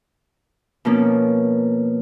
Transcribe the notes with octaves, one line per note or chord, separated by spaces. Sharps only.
B2 F3 A#3 C#4